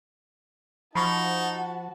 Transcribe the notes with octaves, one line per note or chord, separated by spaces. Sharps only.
F3 D#4 F#4 A5 B5 C#6